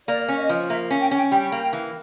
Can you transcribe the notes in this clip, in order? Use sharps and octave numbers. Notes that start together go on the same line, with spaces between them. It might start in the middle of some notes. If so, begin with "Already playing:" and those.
A#3 D5
C#4
D#5
F3
A#3 E5
C#4
G5
C#4 G5
G3 G5
A#3
E3